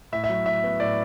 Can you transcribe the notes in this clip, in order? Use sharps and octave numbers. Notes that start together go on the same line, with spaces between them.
A2 E5
E5
F#3
A2 E5
B3
A2 D5